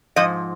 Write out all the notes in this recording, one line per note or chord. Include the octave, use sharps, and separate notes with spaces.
G#2 F3 D#5